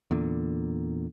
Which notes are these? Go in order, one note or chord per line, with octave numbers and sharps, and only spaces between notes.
E2 A#2 D3